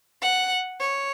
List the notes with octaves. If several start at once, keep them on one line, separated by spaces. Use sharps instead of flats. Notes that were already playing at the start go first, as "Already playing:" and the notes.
F#5
C#5